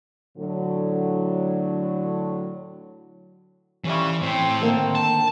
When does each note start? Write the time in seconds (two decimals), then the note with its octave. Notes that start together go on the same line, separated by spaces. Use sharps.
0.38 A2 D3 F#3
3.84 F2 E3 G3 C#4 E5
4.22 A2 C4
4.61 D3 D#3 A#3
4.95 A5